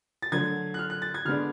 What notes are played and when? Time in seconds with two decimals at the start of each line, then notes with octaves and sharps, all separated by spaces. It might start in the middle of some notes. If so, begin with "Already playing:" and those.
0.22 A6
0.32 D3 F#3 A3 G#6
0.74 F#6
0.79 F6
0.90 F#6
1.02 A6
1.14 G#6
1.25 D3 G#3 B3 D4 F6